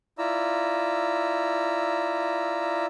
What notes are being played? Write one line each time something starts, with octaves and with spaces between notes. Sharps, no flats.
E4 F4 D5 A#5 E6